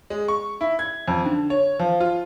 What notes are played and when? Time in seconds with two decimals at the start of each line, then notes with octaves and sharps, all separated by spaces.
0.10 G#3
0.28 C#6
0.61 E4
0.79 G#6
1.08 F2
1.25 D3
1.50 C#5
1.79 F3
2.00 F4